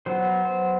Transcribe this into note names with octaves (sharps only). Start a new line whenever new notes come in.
F#3 B3 C5
C5